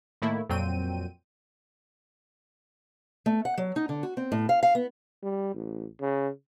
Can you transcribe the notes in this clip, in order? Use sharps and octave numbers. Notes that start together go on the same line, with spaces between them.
A2 D#3 A3 A#3 E4
F2 A#2 F#3 C4 G5 D#7
A3
F#5
F#3
D#4
D3
F#4
C4
A2
F5
F5
B3
G3
A1
C#3